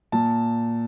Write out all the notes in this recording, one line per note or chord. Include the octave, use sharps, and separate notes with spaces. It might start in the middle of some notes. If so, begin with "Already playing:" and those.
A#2 A5